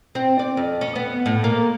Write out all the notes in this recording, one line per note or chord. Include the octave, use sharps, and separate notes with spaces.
C4
D5
F2
C#4
B3
A2
A#3